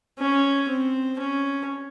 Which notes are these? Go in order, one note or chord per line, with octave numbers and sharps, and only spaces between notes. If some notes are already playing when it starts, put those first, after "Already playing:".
C#4
C4
C#4